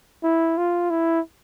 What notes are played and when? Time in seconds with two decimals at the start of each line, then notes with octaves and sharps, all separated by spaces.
0.24 E4
0.57 F4
0.90 E4